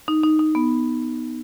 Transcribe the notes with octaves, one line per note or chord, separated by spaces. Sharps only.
D#4
D#4
D#4
B3